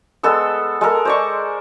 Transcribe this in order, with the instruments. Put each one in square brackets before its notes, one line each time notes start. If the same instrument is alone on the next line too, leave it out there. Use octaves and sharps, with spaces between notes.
[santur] G#3 B3 A4 E6
G#3 A4 A#4
C5 D5 C#6